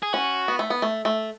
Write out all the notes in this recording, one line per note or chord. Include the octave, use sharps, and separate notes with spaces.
G#4
C#4 F#4
B3
A3
B3
A3
A3